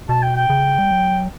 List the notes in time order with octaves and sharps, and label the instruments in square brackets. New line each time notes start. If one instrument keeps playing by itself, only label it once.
[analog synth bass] B2 [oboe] A5
[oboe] G5
G5
[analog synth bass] C#3
G3
F#3